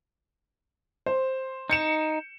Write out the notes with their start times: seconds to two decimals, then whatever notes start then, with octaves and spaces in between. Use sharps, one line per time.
1.06 C5
1.70 D#4 G6 C#7 E7